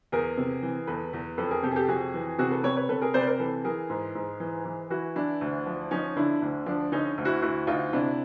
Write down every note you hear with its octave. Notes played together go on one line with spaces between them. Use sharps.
E2 G#4 A#4
C3
E3
E2 A4 B4
E2
F2 A4 B4
G#4 A#4
C3 G4 A4
G#4
G4 A4
F2 F#4 G#4
E3
C3 F#4 G#4
A4 B4
C3 B4 C#5
B4 C#5
C3 A4 B4
G#4 A#4
C3 C5 D5
B4
A#4 C5
E3 A4 B4
E3 G#4 A#4
G#2
G#2
E3
E3
E3 E4 F#4
E3 D4 E4
D2
F3
F3 C#4 D#4
D3 D4 E4
D2 D4
F3 D4
D3 C#4 D#4
D2
E4 F#4
D2 E4 F#4
D2 D#4 F4
C3 D4 E4